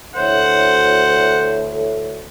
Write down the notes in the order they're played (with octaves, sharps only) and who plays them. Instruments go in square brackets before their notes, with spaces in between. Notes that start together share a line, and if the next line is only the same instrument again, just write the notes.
[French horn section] D2 A4 [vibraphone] E4 C#5 E5 [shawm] C5 [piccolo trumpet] F#5